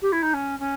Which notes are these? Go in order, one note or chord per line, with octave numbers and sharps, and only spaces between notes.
G4
E4
D#4
C#4
C#4